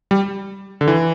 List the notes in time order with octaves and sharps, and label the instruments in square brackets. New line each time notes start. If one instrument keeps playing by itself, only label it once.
[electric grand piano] G3
D3
E3